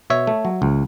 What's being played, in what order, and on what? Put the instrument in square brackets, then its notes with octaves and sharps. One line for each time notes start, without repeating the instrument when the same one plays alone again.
[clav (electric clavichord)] B2 C#5 E5
A3
F#3
C#2